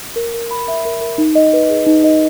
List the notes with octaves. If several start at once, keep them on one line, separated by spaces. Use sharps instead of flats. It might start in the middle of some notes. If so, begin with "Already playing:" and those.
A#4
A#4
B5
E5
A#4
A#4
D#4
D#5
B4
G#4
D#4
D#5